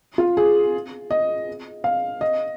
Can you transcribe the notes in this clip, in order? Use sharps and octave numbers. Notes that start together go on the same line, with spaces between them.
F4
G#4
D#5
F5
D#5